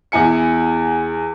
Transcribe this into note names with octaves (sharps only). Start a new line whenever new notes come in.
E2 E4 G#5 C#7